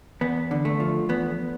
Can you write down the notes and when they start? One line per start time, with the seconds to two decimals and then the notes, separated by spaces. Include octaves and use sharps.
0.21 E2 B3
0.51 D3
0.65 A3
0.80 F3
1.09 E2 B3